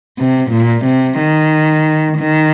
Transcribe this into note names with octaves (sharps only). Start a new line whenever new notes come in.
C3
A#2
C3
D#3
D#3